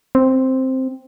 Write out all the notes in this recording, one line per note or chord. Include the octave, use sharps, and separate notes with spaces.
C4